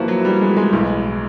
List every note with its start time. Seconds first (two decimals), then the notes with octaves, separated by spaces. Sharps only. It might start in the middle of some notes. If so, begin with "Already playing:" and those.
Already playing: A1 A2 F3 A#3 E4 F#4 B4
0.08 F#3
0.25 G3
0.41 G#3
0.57 G#3
0.73 B1 A2 E3